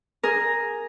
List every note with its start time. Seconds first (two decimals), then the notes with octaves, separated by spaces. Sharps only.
0.23 G#4 A#4